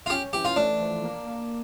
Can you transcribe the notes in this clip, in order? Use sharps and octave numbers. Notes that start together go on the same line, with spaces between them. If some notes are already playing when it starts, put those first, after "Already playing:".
F4
C#4 G4
E3 G4
F4
A3 D4
F3
A#3
A#3